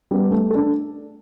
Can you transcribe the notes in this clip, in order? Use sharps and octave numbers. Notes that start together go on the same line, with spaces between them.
G3 B3
A3
D4 A4